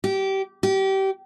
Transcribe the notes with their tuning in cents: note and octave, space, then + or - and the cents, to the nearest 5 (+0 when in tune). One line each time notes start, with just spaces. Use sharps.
G4 -20
G4 -25